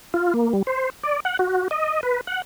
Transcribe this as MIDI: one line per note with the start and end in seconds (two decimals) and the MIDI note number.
0.14 0.34 65
0.34 0.53 58
0.53 0.62 55
0.67 0.90 72
1.03 1.20 74
1.25 1.37 78
1.39 1.68 66
1.71 2.01 75
2.03 2.21 71
2.27 2.42 78